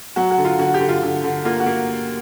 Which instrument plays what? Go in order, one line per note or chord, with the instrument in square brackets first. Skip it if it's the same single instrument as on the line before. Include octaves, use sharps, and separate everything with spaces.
[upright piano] F#3 F#4
F#4
D3
F4
D3 F#4
G4
D3
F4
D3
D3
A#3 F4
F#4
A#3